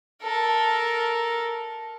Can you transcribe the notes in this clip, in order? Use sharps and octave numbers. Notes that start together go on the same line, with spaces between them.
A4 A#4